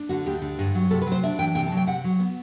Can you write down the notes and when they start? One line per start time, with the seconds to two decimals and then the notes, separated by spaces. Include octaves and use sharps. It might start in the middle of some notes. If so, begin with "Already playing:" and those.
Already playing: D4
0.09 D3 F#4
0.26 D2 G4
0.42 D3
0.59 G2
0.75 F#3
0.91 C3 A4
1.01 B4
1.07 F#3
1.12 C5
1.23 D4 E5
1.39 E3 G5
1.55 C3 G5
1.66 A5
1.72 F#3
1.77 G5
1.87 C3 F#5
2.04 F#3
2.20 B3